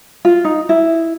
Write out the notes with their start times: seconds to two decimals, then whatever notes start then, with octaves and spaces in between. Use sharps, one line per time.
0.25 F4
0.45 D#4
0.69 E4